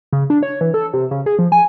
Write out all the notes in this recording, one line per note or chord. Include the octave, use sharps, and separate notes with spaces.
C#3
D4
C#5
E3
A4
C3
C#3
G#4
F3
G#5